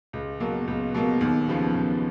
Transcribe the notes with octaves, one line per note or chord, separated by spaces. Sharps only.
C#2
B2 F#3 A#3
C#2
B2 F#3 A#3
D#2
C#3 F3 B3
D#2